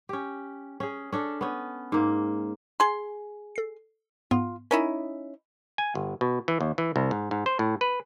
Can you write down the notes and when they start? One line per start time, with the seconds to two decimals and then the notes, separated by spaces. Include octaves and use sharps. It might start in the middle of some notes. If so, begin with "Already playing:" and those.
0.09 C#4 G4
0.80 C#4 G#4
1.12 C#4 D4 A4
1.41 B3 C#4
1.92 G#2 A#3
2.80 G#4 C6
3.56 A4 C7
4.31 G#2 B3 F4
4.71 C#4 D#4 E4 A#4
5.78 G#5
5.95 G1
6.21 B2
6.48 E3
6.61 D#2
6.78 E3
6.96 C2
7.11 G#2
7.31 G#2
7.46 C5
7.59 A2
7.81 B4